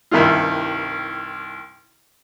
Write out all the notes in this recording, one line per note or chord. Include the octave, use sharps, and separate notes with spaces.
C2 G2 D#3 E4 F4